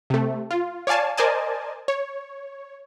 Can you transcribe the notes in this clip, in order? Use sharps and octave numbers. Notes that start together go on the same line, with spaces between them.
C3 A3
F4
C#5 D5 F5 G#5 A5
A#4 C5 D5 D#5 G#5 A5
C#5